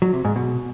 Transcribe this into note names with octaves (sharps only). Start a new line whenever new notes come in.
F#3
C3
G#2
B2